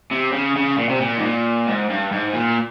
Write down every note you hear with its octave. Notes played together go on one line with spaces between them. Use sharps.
C3
C#3
C#3
A#2
C3
A#2
G#2
A#2
G#2
G2
G#2
A#2